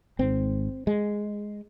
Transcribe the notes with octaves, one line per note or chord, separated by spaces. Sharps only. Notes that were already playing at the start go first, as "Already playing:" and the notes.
G#1 G#2 C4
G#3